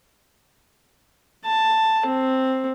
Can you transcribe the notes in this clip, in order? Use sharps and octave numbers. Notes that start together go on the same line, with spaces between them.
A5
C4